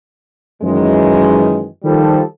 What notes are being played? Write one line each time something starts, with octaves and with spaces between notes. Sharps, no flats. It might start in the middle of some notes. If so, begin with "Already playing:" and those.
F#2 D#3 E3 G#3
D#3 F3 G3 A4